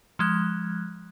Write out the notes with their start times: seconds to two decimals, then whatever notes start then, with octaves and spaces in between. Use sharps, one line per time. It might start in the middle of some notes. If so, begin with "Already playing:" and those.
0.19 F3 G#3 F#6